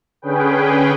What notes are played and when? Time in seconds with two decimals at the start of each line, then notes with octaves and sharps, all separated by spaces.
0.22 D3 C#4 G#4 B4 G5